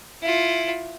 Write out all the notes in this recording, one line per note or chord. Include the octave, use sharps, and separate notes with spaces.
E4 F4